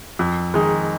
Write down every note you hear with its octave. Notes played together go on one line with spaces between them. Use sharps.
F2
D#3 G#3 D#4 G#4